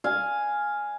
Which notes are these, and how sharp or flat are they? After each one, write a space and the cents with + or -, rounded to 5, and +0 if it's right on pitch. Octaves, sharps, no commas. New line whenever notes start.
F5 +0 G#5 +0